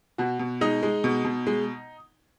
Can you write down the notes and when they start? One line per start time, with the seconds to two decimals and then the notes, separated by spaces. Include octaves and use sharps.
0.18 B2 F#4
0.39 B2
0.61 G#3 D#4
0.83 G#3
1.04 B2
1.25 B2
1.47 G#3